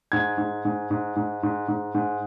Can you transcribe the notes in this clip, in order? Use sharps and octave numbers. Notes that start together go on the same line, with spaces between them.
G#2 G#6
G#2
G#2
G#2
G#2
G#2
G#2
G#2